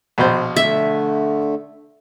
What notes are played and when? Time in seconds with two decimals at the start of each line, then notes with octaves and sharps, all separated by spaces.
0.18 A#1 B2 C5
0.56 D3 A3 E5